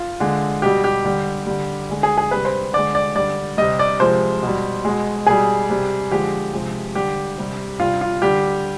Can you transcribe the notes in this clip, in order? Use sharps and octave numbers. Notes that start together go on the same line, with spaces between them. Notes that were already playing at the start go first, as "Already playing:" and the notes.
Already playing: F4
D3 G#3
B2 G3 G4
G4
D3 G3
D3 G3
D3 G#3
G#4
G#4
C3 G3 B4
C5
D3 G#3 D5
D5
D3 G3 D5
C3 G3 D#5
D5
C3 F3 G#3 C5
B2 G3
B2 G#3
B2 G3 G#4
C3 G3
D3 F3 G#3 G4
C3 F3 G#3
D3 G3 G4
C3 G3
C3 G3 F4
F4
D3 G3 G4